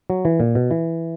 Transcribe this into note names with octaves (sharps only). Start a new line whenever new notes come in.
F#3
E3
A#2
B2
E3